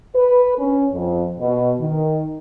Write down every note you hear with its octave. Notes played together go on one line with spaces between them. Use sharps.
B4
C#4
F2
B2
D#3